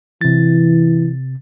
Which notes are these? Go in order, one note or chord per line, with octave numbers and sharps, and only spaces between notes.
C3 E3 A6